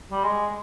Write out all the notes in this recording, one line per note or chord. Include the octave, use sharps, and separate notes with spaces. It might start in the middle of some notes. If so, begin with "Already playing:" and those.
G3
G#3